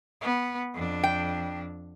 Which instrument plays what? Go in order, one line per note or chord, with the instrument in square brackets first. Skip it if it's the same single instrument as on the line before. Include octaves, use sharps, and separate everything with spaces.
[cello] B3
F2 D4
[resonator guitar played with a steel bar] G5